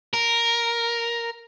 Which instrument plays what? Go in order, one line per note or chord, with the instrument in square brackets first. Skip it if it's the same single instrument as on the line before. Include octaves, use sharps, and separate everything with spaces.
[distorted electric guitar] A#4